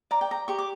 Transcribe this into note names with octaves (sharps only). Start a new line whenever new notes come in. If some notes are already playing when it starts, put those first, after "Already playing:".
D5 A#5
G5
A#5
G4 C#6
D6